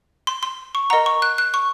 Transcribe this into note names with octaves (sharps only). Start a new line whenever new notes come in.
C6
C6
C#6
A#4 D#5 F#5 A#5
C#6
F#6
F#6
C#6